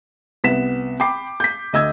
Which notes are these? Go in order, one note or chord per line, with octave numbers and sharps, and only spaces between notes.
C2 B3 B6 E7
G5 B5 D6 C7
G6 B6
D2 D#5 E6 G#6